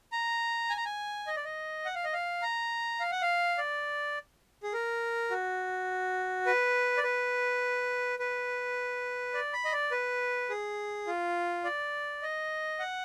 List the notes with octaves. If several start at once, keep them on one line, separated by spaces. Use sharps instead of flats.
A#5
G#5
A#5
G#5
D#5
D5
D#5
F#5
F5
D#5
F5
A#5
F5
F#5
F5
D5
G#4
A#4
F#4
B4
D5
B4
B4
D5
B5
D#5
D5
B4
G#4
F4
D5
D#5
F#5